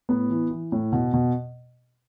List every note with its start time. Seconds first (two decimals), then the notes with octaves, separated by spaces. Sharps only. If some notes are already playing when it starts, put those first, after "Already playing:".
0.09 A2 B3
0.30 E3
0.51 E3
0.72 A2
0.92 B2
1.13 B2